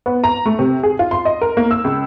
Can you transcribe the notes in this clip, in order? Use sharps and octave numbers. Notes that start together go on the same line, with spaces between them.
B3
A#5
A3
C3
G#4
F4
C6
D#5
A#4
A#3
E6
C#2